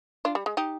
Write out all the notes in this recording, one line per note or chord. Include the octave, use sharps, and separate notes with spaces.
D4 F4
G3
G#3
D#4 G4